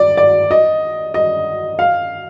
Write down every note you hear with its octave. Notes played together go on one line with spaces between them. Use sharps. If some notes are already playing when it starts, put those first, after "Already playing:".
Already playing: D5
D5
D#5
D#5
F5